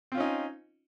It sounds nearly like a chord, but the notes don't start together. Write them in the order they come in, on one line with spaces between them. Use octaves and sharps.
C4 F4 C#4 D#4